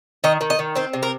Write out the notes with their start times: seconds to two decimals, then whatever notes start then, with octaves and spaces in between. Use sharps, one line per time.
0.24 D#3 D#5
0.41 D#3
0.50 D#5
0.59 D#3
0.75 C4 C5
0.93 C3
1.03 A#4